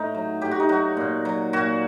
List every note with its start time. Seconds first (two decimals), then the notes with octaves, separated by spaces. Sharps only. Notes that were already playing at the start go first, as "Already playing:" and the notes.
Already playing: A2 D#4
0.15 F#3
0.41 A2 G4
0.51 F#4
0.60 D#4
0.69 F#3 F#4
0.97 A#2
1.25 F#3
1.53 A#2 F#4